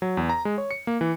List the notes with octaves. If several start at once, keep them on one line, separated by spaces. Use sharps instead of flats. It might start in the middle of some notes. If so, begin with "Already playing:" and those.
F#3
E2
A#5
G#3
C#5
C#7
A#3
E3